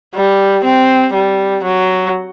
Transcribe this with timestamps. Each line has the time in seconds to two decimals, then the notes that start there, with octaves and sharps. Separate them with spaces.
0.14 G3
0.64 C4
1.13 G3
1.64 F#3